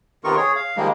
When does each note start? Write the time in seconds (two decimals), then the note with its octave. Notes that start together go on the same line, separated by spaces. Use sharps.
0.24 C3 D#3 B3 F4 A#4 C#6
0.37 G#4 C#5
0.56 F5
0.77 D#3 F3 G3 G#3 A#3